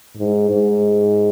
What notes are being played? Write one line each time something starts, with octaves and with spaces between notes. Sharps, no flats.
G#2
G#2